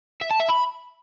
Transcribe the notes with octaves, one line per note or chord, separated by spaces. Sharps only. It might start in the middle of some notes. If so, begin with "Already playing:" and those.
E5
A5
E5
B5